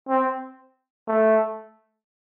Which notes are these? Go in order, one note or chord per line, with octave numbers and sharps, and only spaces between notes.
C4
A3